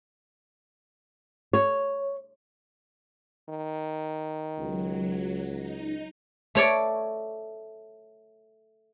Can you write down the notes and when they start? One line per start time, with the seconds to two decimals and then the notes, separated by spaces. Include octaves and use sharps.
1.53 C#5
3.49 D#3
4.58 C#2 F#3
5.49 D#4
6.55 A3 C#5 D5